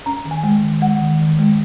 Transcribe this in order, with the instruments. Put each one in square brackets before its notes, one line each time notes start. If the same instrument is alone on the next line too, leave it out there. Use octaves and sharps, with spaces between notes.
[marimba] C#4 A#5
D#3
G#5
G#3
D#3
G#3 F#5
D#3
D#3
G#3